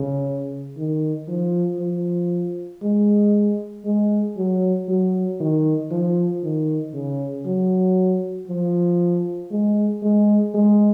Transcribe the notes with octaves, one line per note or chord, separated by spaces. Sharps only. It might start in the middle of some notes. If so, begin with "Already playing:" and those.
Already playing: C#3
D#3
F3
F3
G#3
G#3
F#3
F#3
D#3
F3
D#3
C#3
F#3
F3
G#3
G#3
G#3